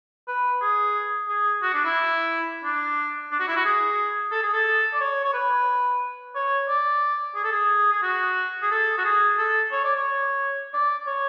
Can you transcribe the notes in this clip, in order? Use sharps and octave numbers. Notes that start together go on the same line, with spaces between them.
B4
G#4
G#4
F#4
D4
E4
D4
D4
F#4
E4
F#4
G#4
A4
G#4
A4
D5
C#5
C#5
B4
C#5
D5
G#4
A4
G#4
G#4
F#4
G#4
A4
F#4
G#4
A4
C#5
D5
C#5
D5
C#5